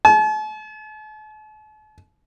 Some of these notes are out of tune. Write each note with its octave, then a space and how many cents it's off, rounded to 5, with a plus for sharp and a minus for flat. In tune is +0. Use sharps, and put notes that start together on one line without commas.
A5 -45